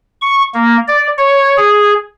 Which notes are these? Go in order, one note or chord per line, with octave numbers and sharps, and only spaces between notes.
C#6
A#3
D5
C#5
G#4